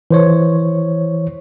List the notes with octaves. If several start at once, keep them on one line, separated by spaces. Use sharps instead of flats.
E3 C5 C#5